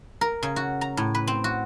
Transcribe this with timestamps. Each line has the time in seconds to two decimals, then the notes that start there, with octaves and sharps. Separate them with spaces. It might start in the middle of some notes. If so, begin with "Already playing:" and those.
0.21 A#4
0.43 C#3
0.56 F#4
0.81 A#5
0.97 A2
1.15 B4
1.27 C4
1.44 F#4